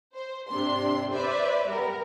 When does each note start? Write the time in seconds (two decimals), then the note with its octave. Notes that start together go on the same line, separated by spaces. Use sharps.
0.14 C5
0.50 G#2 C3 D4 C6
1.11 B4 C5 D5 E5
1.69 G3 B3 A#4